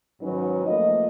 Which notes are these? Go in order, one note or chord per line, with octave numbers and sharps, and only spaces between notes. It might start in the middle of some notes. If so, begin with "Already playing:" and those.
G#2 D#3 F#3 C#4 D#4 B4
F3 A3 A#3 D#5